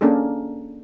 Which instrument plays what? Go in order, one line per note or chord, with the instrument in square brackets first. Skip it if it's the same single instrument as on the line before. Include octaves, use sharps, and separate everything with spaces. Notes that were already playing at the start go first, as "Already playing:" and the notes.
[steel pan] A#3 C#4 D4 G#4 A4